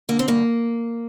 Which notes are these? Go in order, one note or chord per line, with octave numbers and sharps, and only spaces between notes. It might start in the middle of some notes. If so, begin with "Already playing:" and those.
D3 A#3
C4
G2 A#3